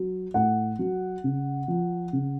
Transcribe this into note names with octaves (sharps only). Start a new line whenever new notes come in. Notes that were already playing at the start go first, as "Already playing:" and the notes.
Already playing: F#3
A2 F#5
F#3
C#3
F3
C#3